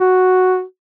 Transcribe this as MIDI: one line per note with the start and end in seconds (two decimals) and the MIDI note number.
0.01 0.63 66